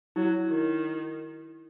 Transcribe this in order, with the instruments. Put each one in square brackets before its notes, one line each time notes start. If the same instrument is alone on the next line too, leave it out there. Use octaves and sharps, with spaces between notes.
[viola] F#3 [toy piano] E4
[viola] D#3